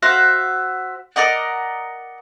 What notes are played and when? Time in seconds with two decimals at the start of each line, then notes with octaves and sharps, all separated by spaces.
0.03 F#4 C5 E5 F5
1.16 A#4 D5 D#5 F#5